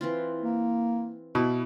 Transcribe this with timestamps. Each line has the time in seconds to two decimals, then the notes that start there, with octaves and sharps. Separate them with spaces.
0.01 E3 C4 F4
0.41 A#3
1.35 B2 E4